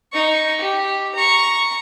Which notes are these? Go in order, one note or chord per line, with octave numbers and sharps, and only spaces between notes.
D#4 C#6
G4
A#5 C#6